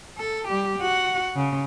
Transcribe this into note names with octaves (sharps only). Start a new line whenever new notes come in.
A4
G3 G4
F#4 F#5
C#3